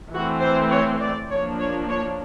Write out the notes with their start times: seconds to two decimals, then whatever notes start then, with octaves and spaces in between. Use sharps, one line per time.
0.13 E3 A3 C4 F#4
0.42 C5
0.71 C#5
1.01 D5
1.30 F3 A#3 D4 C#5
1.60 C#5
1.90 C#5